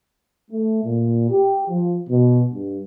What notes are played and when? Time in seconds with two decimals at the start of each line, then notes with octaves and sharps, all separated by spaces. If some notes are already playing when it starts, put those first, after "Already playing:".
0.50 A3
0.84 A#2
1.30 G4
1.68 F3
2.09 B2
2.52 G2